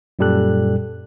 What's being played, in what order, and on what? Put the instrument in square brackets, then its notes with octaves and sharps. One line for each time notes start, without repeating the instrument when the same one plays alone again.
[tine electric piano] F#2 A#2 G3 G4 A4 F#6